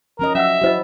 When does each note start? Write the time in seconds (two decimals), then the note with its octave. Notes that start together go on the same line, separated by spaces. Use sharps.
0.19 F3 C#4 A#4 D#5
0.35 F#3 C#4 E5 F#5 E6
0.61 F#3 E4 F#4 C5 D#5